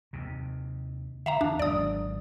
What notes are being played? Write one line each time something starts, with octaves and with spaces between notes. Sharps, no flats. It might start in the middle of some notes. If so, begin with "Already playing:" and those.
D#2 C3
D3 D#3 E5 F5 A#5
E2 D4
G#1 D#3 F#3 D5 D#6